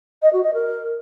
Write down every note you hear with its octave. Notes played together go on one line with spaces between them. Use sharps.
D#5
F#4
D#5
A#4